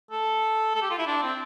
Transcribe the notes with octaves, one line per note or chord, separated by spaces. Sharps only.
A4
A4
G4
F4
E4
D4
C4